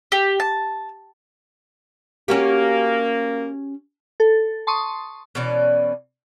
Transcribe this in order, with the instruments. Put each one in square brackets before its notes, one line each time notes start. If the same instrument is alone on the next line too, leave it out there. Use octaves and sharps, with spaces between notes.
[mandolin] G4
A5
[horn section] A#3 [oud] C#4 F#4 G4
[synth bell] A4
A5 C6 C#6 D#6
[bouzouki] B2 E3 C#4 D5